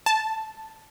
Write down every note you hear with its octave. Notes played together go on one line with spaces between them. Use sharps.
A5